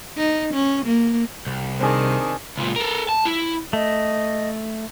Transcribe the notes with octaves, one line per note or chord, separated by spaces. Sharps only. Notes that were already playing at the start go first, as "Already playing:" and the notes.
D#4
C#4
A#3
C2
C3 D#3 D4 G#4 C5
C#2 A#2
A4 A#4
A5
E4
A3 D#5